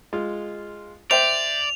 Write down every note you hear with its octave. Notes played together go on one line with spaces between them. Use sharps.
G#3 F4
C5 D5 E5 G5 F7